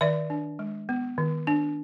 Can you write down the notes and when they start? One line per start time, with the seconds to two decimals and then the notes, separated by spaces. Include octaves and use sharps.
0.01 D#3 D5 E5
0.30 D4
0.59 G#3
0.89 B3
1.18 D#3
1.47 D4